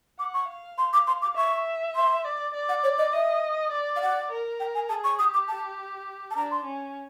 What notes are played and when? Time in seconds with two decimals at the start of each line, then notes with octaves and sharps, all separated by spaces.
0.19 F#5 D6
0.34 C#6
0.49 F5
0.78 C6
0.93 D6
1.07 C6
1.22 D6
1.36 E5 C#6
1.96 C6
2.24 D5
2.54 D5
2.69 F#5
2.83 C#5
2.98 D#5
3.13 D#5 E5
3.71 D5
3.96 F5
4.01 F#5
4.31 A#4
4.60 G5
4.74 G#5
4.89 G#4 A5
5.04 C#6
5.19 G4 D#6
5.34 D6
5.48 A5
6.31 A5
6.36 D4 A#5
6.51 C6
6.65 C#4